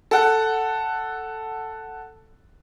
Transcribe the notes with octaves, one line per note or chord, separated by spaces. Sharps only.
A4 F#5